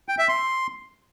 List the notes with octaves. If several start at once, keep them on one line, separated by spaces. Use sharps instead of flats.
G5
E5
C6